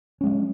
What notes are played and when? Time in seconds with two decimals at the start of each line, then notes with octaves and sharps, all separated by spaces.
0.21 C#4
0.24 G#3
0.26 F#3